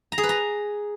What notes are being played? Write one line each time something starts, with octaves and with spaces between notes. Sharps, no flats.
A#5
G#4
B4
A#5